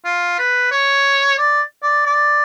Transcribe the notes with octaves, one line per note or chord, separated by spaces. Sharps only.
F4
B4
C#5
D5
D5
D5